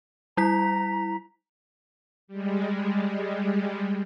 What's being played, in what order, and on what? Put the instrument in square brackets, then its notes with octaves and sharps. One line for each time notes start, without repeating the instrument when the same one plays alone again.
[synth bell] G3 E4 B6 [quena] A#5
[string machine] G3 G#3